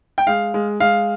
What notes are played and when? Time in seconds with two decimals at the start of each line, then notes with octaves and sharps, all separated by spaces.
0.18 G5
0.27 G#3 F5
0.54 G#3
0.80 G#3 F5